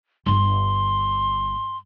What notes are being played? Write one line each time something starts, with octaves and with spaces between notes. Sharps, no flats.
G1 C6